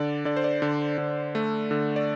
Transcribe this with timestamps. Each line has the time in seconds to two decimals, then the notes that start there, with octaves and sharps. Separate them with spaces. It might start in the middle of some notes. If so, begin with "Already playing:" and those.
Already playing: D3 D5
0.25 D3 D5
0.36 C5
0.44 D5
0.62 D3
0.98 D3
1.35 A3
1.71 D3
1.96 D5